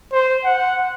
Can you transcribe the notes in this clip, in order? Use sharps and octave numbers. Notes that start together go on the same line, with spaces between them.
C5
F#5